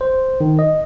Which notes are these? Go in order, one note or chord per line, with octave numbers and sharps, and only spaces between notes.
C5
D#3
D#5